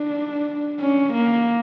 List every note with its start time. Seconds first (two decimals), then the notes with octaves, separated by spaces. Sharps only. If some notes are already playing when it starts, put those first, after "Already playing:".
Already playing: D4
0.80 C#4
1.13 A#3